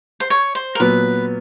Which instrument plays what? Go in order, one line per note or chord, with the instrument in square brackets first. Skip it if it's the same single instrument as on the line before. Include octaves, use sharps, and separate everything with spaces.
[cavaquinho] C5
C#5
C5
A#4
[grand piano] A#2 F#3 B3 [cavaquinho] B4